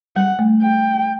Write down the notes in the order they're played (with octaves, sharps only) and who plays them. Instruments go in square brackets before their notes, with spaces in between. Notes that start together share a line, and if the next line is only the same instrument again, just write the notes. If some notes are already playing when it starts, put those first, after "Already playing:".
[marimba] G3 [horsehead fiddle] F#5
[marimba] A3
[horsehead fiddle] G5